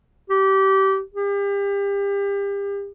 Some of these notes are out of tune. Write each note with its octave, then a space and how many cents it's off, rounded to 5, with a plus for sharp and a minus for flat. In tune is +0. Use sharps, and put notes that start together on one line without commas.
G4 -25
G4 +35